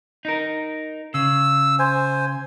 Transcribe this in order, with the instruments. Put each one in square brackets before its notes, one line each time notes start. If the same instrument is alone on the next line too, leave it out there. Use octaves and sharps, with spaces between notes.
[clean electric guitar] D#4 A#4
[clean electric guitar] C#3 [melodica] E6
[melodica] C5 G#5